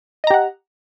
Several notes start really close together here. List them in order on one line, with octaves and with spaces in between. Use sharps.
D#5 A#5 G4 F#5